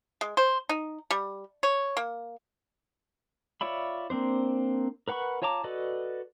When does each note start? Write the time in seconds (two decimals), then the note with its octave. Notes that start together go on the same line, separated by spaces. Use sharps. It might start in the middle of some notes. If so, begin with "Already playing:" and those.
0.21 G#3
0.37 C5
0.69 D#4
1.11 G3
1.63 C#5
1.97 A#3
3.61 F4 C#5 D5 E5 B5
4.10 A#3 C4 D4 C5
5.08 A#4 B4 F#5 B5 C#6
5.42 F4 C#5 A5 A#5 D6
5.64 F#4 A4 B4 D5 D#5